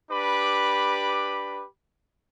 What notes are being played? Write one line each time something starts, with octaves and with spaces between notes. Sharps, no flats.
D4 G4 B4 B5 D6